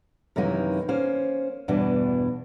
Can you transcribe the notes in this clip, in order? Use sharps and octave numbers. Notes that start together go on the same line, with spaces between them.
F#2 C3 D#3 E3 A#3 D#4
A#3 C#4 C5
E2 G2 B2 E3 D4